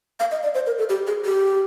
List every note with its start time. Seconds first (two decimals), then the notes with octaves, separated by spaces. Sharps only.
0.20 F5
0.31 D#5
0.43 D5
0.55 C5
0.66 A#4
0.78 A4
0.89 G4
1.07 G#4
1.25 G4